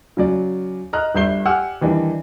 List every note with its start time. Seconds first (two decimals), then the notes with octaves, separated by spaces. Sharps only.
0.17 C#3 F#3 D5
0.93 D#5 A#5 F6 F#6
1.15 G1 G2 E5 G6 C7 G7
1.45 G4 F#5 G#5 D6 E6 F6
1.81 D#3 E3 G3 D4